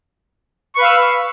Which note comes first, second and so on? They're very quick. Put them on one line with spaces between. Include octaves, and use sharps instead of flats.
C#6 B4 F5 E6